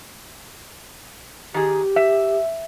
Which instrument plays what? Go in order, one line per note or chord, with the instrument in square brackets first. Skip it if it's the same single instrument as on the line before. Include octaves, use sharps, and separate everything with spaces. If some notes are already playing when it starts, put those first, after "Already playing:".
[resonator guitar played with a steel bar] D#3 G#4 [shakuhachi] G4
[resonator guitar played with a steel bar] E5